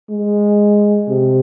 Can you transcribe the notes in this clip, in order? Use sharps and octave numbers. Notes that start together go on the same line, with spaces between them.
G#3
C3